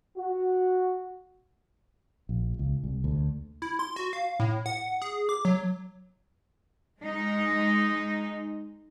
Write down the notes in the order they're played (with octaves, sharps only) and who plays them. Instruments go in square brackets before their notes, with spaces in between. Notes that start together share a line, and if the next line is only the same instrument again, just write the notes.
[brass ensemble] F#4
[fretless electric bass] A#1
C#2
C2
D2
[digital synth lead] E4
C6
F#4
F5
A2
F#5
G#4
D6
F#3
[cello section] G#3 D#4